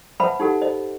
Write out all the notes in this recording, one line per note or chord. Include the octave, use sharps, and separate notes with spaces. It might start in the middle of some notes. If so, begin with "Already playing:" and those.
B4 C5 E5 F#5 A5 B5
D#4 G4 A4 F#5
C5 D#5